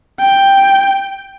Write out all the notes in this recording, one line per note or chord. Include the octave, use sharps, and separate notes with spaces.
G5